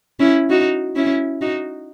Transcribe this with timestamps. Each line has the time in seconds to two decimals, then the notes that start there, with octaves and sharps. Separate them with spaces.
0.20 C#4 E4
0.50 D#4 F#4
0.96 C#4 E4
1.42 D#4 F#4